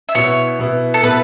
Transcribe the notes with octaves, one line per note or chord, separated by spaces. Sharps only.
E5
B2 B3 E4 C#5
B2 B3 E4
A4
B2 B3 E4 B4